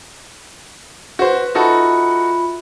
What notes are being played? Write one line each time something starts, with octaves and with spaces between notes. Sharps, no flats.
F#4 B4 C5
D#4 F4 F#4 A4 E5 B5